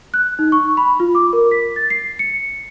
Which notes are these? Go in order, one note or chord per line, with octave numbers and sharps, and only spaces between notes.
F#6
D#4
C#6
B5
F4
D6
A#4
B6
A6
C7
C#7